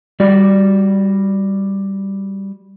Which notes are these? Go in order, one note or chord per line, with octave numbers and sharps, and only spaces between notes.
G3 F#4 D5